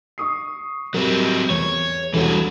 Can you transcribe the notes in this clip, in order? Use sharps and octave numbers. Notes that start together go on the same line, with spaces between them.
C#6 D#6 C7
F#3 G3 C4 A#4
E2 C#5
E1 C2 E3 F#4 A4